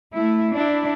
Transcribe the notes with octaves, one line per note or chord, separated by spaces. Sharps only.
A3 E4
D4 E4